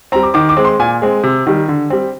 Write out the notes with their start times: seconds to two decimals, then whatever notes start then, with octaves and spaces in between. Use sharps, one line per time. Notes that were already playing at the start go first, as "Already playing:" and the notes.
0.12 G3 C4 A#5
0.23 D6
0.34 D#3 D6
0.49 D6
0.57 G#3 C4
0.65 C6
0.79 A#2 G#5
1.02 G#3 C4
1.23 C3
1.47 D#3 G3
1.68 D3
1.90 G3 C4